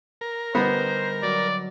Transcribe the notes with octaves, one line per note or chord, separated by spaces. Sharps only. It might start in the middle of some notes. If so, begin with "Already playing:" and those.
A#4
D3 G3 B3 D#4 C5
F#3 D5